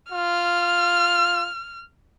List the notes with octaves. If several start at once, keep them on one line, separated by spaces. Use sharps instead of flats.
F4 F6